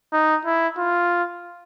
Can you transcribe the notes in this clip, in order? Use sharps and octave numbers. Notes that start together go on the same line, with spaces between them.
D#4
E4
F4